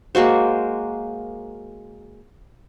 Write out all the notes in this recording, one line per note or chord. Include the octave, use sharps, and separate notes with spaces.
G#3 A#3 F#4 C5